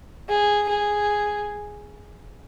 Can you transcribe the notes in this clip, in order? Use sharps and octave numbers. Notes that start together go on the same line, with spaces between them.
G#4
G#4